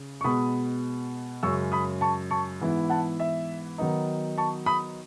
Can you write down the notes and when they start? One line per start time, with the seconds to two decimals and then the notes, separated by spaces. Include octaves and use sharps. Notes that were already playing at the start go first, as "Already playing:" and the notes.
Already playing: C#3
0.21 C#6
0.24 B2 G#3 B3 B5 D#6
1.43 F#2 C#3 G#3 C#6 E6
1.72 B5 D#6
2.01 A5 C#6
2.30 A5 C#6
2.61 G#2 E3 B3 E4
2.90 F#5 A5
3.20 E5
3.78 D#3 F#3 B3 D#4
4.38 A5 C#6
4.66 B5 D#6